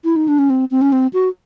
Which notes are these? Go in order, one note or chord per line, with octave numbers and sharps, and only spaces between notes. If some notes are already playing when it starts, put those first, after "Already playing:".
E4
D#4
D4
C#4
C4
C4
C#4
C4
F#4